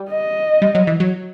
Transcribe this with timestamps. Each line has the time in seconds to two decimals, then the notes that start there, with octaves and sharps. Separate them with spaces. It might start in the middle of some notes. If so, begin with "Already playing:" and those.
Already playing: G3
0.11 D#5
0.62 G3
0.75 F#3
0.87 E3
1.00 F#3